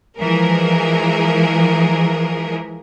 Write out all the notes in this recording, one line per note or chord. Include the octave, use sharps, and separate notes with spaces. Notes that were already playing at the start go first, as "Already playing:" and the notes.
E3 F3 G#3 G#4 A#4